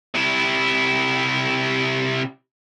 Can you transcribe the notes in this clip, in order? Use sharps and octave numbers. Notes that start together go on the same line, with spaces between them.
C3 E4